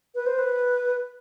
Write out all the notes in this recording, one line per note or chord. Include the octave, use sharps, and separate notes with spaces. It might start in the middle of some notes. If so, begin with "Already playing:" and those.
B4
C5
B4